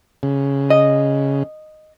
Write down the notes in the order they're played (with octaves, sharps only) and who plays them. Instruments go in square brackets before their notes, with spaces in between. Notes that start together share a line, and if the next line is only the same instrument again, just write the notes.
[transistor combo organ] C#3
[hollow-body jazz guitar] D#5